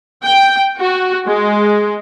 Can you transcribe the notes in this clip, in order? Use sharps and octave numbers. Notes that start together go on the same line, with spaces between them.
G5
F#4
G#3